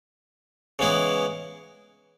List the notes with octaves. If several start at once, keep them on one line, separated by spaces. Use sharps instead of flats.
C#3 E3 G#3 B3 E4